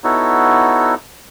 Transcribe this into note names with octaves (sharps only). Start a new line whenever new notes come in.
B3 D#4 E4 F#4 A4 C#5